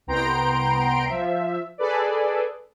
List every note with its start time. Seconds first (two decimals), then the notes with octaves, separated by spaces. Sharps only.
0.07 C2 B3 G5 A#5 C6 D7
1.06 F3 E5
1.78 G#4 A4 B4 D5